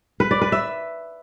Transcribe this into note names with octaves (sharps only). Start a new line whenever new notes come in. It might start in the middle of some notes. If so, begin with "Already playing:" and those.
B4
D5
B4
E5